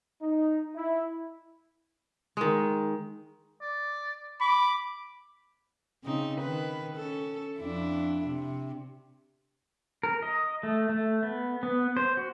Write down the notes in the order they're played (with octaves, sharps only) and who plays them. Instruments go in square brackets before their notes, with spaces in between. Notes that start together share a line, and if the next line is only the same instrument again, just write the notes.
[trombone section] D#4
E4
[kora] D#3 G#3
[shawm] D5
[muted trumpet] B5 [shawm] D6
[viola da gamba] C#3 C4 D#4
D#3 B4
C#4 A4
F2 D4 E4
C3
[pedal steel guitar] A#4
D#5
A3
A3
B3
B3
C5
F#4